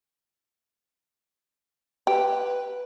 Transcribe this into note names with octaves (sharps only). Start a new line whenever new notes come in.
G4 B4